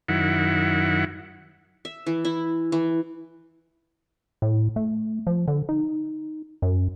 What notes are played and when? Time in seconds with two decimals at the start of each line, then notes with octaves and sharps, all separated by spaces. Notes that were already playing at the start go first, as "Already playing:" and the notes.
0.08 F#2 D#3 E4 F#5
1.85 E5
2.06 E3
2.25 E4
2.72 E3
4.42 A2
4.76 A3
5.27 F3
5.48 D3
5.69 D#4
6.62 F#2